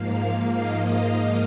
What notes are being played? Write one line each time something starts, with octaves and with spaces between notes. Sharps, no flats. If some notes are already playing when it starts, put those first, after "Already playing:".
Already playing: G#2 F3 A#3 F5
D#5